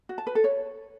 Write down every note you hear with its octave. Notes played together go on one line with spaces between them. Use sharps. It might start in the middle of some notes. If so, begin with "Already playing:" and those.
F#4
A5
B4
A4
C#5